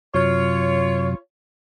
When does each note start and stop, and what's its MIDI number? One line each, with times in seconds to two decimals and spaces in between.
0.14 1.15 42
0.14 1.15 48
0.14 1.15 54
0.14 1.16 65
0.14 1.16 73